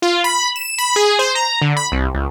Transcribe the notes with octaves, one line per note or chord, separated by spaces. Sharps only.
F4
B5
E7
B5
G#4
C5
A#5
D3
B5
C2
C#2